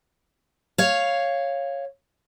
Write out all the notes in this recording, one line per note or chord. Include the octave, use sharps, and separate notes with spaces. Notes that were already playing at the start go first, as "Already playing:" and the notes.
C#5 F5